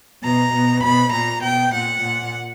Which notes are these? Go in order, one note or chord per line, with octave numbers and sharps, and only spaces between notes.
B2 A#5
B2
B2 B5
A#2 A#5
B2 G5
A#2 F#5
A#2